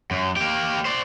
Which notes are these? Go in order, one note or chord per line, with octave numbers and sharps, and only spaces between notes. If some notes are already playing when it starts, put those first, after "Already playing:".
F#2
A#3 G4
C5 D5